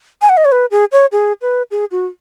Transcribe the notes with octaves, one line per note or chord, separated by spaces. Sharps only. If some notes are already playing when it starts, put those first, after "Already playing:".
G#5
F#5
D#5
C#5
B4
G#4
C#5
G#4
B4
G#4
F#4